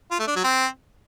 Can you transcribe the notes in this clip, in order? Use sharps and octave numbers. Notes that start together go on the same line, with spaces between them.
F4
A3
D4
F#3
C4